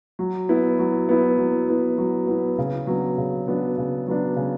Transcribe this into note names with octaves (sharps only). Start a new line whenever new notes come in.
F#3
B3 E4
F#3
B3 E4
F#3
B3 E4
F#3
B3 E4
C#3
F#3 B3 D4
C#3
F#3 B3 D4
C#3
F#3 B3 D4
C#3